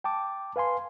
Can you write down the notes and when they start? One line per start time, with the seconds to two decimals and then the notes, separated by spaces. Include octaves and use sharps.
0.04 G5 A5 D6
0.56 B4 F5 G#5 C6